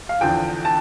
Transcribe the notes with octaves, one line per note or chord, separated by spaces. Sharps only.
F5
E2 D3 F3 G5
A5